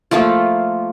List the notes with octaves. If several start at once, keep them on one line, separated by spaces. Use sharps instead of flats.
F3 A3 A#3 F4